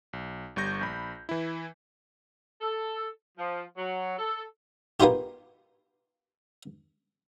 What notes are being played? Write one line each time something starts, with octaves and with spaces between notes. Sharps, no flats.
B1
G1 G3 C#6 G6 A#6
A#1 B5
E3 E4
A4
F3
F#3
A4
A#3 B3 D#4 F4 G4